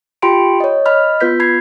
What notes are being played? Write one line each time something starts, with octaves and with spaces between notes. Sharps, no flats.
F4 G4 G5 B5 C6 D7
C#5 D#5
D#5 B5 F6
B3 F4 B4 G6 B6
B5 G#6 C7